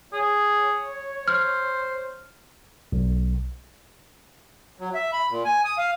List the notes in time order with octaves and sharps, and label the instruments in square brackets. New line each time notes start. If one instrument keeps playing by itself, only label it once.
[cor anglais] G#4 [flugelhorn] C#5
[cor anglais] C5 [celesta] F6
[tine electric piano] B1
[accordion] F#3
E5
B5
A#2
G#5
D#6
F5